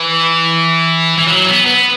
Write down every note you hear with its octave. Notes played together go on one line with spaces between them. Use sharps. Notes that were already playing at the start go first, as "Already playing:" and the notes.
Already playing: E3
E3
F#3
B3
B3